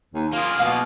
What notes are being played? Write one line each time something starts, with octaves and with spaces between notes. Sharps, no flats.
D#2
A#3 F4 G#4
B2 F5